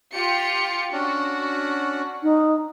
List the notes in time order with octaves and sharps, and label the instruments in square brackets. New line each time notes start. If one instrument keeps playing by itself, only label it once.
[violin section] F4 G4 C#7
[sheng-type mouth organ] C#4 D4 [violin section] F#4
[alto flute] D#4